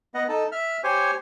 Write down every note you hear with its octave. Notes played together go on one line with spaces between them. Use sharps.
B3 D#5 F#5
D#4 A4
E5 F6
G4 C5 C#5 G#5